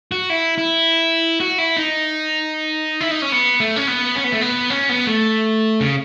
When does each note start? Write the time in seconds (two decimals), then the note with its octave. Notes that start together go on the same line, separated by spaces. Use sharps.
0.12 F#4
0.30 E4
0.58 E4
1.40 F#4
1.58 E4
1.77 D#4
3.01 E4
3.11 D#4
3.22 C#4
3.32 B3
3.60 A3
3.76 C#4
3.88 B3
4.15 C#4
4.24 B3
4.32 A3
4.41 B3
4.70 C#4
4.89 B3
5.07 A3
5.80 C#3